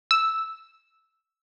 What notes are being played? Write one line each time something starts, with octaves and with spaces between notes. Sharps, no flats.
E6